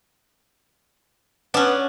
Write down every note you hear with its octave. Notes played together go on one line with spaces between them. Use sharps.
B3 C#4 D4